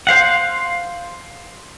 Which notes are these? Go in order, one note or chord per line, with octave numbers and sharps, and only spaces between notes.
C5 F5 F#5